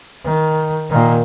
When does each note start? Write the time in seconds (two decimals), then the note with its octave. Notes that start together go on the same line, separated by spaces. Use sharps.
0.25 D#3
0.90 A#2 D#3